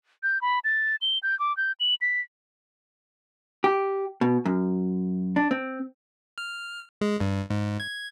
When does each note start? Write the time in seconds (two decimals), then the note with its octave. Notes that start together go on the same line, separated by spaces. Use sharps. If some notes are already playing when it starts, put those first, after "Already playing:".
0.23 G6
0.42 B5
0.64 A6
1.01 G7
1.23 G6
1.39 D6
1.57 G6
1.80 F#7
2.01 B6
3.64 G4
4.21 B2
4.45 F#2
5.36 D4
5.51 C4
6.38 F6
7.01 G#3
7.20 G2
7.50 G#2
7.80 G#6